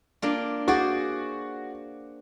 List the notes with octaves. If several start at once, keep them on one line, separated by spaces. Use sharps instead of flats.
A#3 D4 F4
F#4 G#4 C5 D5 F#5